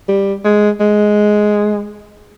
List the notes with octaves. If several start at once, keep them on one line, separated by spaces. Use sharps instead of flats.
G3
G#3
G#3